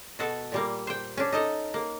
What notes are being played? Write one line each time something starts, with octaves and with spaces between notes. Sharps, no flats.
B2 F#4 A4 F#5
A#2 G3 A#3
C5 G5
C#4 D4
D#4 A4 D#5
A#3